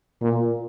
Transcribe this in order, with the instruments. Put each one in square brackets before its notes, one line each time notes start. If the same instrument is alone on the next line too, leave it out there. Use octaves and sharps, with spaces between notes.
[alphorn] A#2